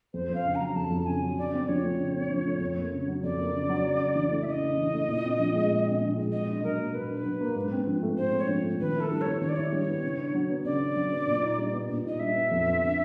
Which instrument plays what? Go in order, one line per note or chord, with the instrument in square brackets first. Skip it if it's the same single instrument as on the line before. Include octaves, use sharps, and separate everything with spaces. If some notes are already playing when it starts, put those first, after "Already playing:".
[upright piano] F2 [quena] C5
[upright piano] F2 [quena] F5
[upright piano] C#3
[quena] A#5
[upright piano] F#3
[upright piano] F2 [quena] A5
[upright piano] F2
[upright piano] C#3 [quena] G#5
[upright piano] F#3
[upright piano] C#3 [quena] D5
[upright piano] C4
[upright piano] F3 [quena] C#5
[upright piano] A3
C#3
C4
F3
A3
F2
A#3
C#3
F#3
[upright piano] F2 [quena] D5
[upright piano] A#3
C#3
F#3
C#3
C#3
E3
A3
[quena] E5
[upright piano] C#3 [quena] D#5
[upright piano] C#3
E3
A3
A#2
C4
F3
G#3
A#2
C4
F3
G#3
[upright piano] B2 [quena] D#5
[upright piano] D4
[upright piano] F#3 [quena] A#4
[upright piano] A#3
[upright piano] B2 [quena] B4
[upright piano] D4
F#3
A#3
G#2
C4
F3
A3
[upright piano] G#2 [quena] C5
[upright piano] C4
[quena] C#5
[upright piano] F3
A3
[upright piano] D#3 [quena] B4
[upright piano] E4 [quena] A4
[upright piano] G3
[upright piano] B3 [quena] C#5
[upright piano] D#3 [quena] C#5
[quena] D5
[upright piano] E4 [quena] C#5
[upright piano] G3
B3
C#3
D4
F#3
B3
[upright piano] C#3 [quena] D5
[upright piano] D4
F#3
B3
A#2
D#4
G3
B3
A#2
[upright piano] D#4 [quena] D#5
[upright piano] G3 [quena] E5
[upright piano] B3
F2
B3
D3